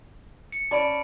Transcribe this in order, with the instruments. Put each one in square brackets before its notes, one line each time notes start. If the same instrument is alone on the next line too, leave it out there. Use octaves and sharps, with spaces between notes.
[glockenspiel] C#7
[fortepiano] C#4 D5 [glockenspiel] A5 B5 D7